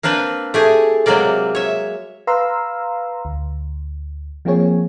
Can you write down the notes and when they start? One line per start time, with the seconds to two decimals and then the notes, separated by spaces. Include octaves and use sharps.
0.03 A#3 C4 D4 B4
0.54 A3 G4 G#4
1.06 C3 F#3 G#3 A#3 D5
1.55 C#5 E5
2.27 B4 F5 A#5 C6 E6
3.25 D2
4.45 F3 A#3 C4 G#4 C#5